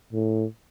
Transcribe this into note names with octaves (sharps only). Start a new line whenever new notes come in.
A2